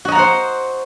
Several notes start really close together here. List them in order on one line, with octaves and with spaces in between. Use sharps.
F#4 D#5 A#5 F#5 C5